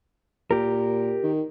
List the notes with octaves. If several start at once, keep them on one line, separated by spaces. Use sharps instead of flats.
A#2 G4 A#4
D#3